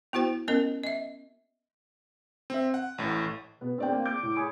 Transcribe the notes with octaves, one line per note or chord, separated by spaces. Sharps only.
B3 E4 F#4 C5 G5
B3 C#4 A#4 D#5
D#5 E5
C4 E5
F#5
A1 A2
B2 B3
F2 A3 C4 D4 D5 G5
A#3
D6 G6
A2
C#5 G#5 B5 D#6